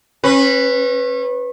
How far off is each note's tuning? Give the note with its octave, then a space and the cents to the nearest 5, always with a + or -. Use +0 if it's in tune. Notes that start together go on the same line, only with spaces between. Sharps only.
C#4 -35 B4 +0